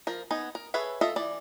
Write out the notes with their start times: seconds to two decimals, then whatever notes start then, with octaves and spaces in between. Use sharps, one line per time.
0.07 F3 A#4
0.31 B3 D#4 G#5
0.55 A#4
0.74 G#4 A4 B4 C#5 E5
1.01 F4 A4 D#5 E5
1.16 E3 D5